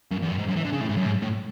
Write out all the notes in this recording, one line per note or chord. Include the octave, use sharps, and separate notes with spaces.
F#2
E2
F#2
G#2
F#2
E3
D3
C#3
A2
G#2
F#2
G#2
A2